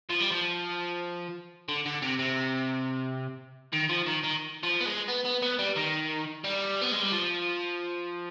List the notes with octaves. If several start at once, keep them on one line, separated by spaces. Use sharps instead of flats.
F3
G3
F3
D3
D3
C3
C3
D#3
F3
D#3
D#3
F3
B3
G#3
B3
B3
B3
G3
D#3
G3
B3
G#3
G3
F3